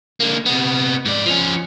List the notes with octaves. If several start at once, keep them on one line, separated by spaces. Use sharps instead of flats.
D3 A#3
C3 B3
G#2 D5
F3 C#4